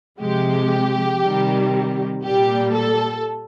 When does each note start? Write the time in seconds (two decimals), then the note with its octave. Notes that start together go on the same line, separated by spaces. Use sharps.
0.20 C3 F3 G#3 G4
1.21 C3 D#3 G3
2.24 A#2 G3 G4
2.73 A4